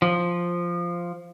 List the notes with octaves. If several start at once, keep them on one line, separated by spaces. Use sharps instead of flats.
F3